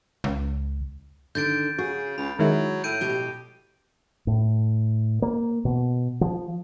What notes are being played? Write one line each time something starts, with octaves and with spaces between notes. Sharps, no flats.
C#2
D3 D#3 G6 A6 D7
C#3 F#4 G#4
C#2 B5
D#3 F#3 G#3 E4
A2 G6 D7 D#7
B2 G4
A2
A#3
B2
F3